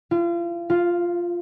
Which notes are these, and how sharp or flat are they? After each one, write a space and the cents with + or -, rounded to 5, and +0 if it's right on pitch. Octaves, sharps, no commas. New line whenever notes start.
F4 -35
F4 +0